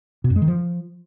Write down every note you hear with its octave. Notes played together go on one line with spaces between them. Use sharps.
B2
F#2
G#3
D#3
F3